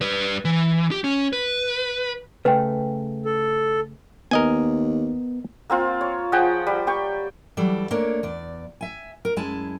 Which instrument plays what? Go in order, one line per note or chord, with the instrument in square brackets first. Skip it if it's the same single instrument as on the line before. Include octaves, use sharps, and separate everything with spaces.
[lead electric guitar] G3 B4
E3
G4
C#4
B4
[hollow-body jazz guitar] C#3 A3 [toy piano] B4 G5
[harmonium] A4
[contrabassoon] D#2 [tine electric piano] B3 [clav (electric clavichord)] A#4 D#5 G#5
[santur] A#3 C4 F4
C#5
F3 G#4 F#5 G5
G3
G4 G5 C#6
[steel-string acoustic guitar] E3 F#3 G3 A4
A3 A#3 D4 A#4 C#5
E2 D5
E5 G#5
A#4
F#2 G#3 E4 G#5 A5